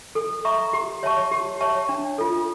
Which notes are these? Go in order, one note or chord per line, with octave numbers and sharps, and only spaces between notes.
A4
E5 A#5 C#6
G4
C#5 E5 A5 C#6
G4
C#5 E5 A5 C#6
D4
F4 A4